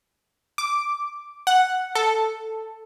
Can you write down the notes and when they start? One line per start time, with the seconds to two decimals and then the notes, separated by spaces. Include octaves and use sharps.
0.58 D6
1.47 F#5
1.95 A4